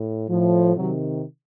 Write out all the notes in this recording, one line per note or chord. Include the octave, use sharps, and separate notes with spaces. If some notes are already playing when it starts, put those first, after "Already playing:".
Already playing: A2
A2 F3
C3 D#3 F#3